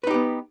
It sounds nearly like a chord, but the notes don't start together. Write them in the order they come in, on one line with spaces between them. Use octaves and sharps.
B4 D#4 G4 B3